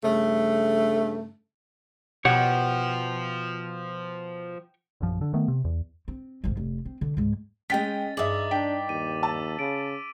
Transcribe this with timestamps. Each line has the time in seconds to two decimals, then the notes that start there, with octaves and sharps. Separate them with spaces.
0.04 G2 C#3 A3
2.25 B2 F3 G4 C#5 F#5
5.01 A#1 F#2 F3
5.21 D3
5.34 D#3 A3 B3
5.48 C3
5.65 E2
6.08 C4
6.44 G#1 F3
6.57 F1
6.85 C4
7.01 D3
7.17 C#2 G#2
7.70 G#3 C#4 D#5 G5 A6 B6
8.17 G2 D#4 G#4 E5 D6 F#7
8.51 D4 G5 B6
8.89 D#2 D#7
9.23 A5 E6
9.59 C#3 D7